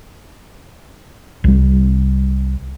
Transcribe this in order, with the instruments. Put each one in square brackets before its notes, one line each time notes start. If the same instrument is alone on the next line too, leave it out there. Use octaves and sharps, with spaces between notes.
[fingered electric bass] C2 G3